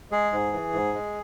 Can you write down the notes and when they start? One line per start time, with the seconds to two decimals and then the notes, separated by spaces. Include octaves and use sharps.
0.11 G#3 G#4
0.32 G#2
0.53 E3
0.73 G#2
0.94 G#3